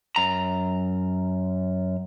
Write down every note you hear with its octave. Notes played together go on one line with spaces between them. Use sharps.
F#2 A#5